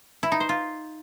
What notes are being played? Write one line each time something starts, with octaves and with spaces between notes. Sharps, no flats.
E4
D#4
C5
F4